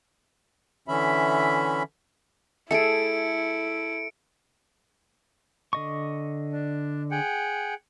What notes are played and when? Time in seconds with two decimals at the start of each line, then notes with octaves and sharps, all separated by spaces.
0.88 D3 E3 C#4 E5 B5
2.71 A3 E4 G#4 A4 C#7 D7
5.73 D3 D#5 C#6
6.52 D4
7.11 G#4 F#5 G5